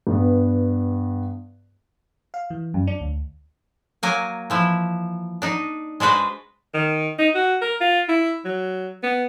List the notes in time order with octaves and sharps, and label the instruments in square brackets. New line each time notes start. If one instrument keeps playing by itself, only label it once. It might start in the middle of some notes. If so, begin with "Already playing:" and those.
[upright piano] G2 B3
[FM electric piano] F5
E3
F#2
D4
D2
[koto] F#3 A#3 G#5
E3 F3 E4
D4 D#4
G#3 D4 F#4 B4 C5
[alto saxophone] D#3
D#4
F#4
A#4
F4
E4
F#3
B3